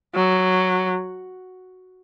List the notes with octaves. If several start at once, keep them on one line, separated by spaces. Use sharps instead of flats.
F#3